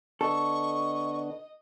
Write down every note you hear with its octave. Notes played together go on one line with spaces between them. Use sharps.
D3 B3 D4 A4 D#5 C#6